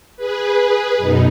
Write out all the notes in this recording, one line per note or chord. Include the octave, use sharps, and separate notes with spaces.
G#4 B4
F#2 B2 D#4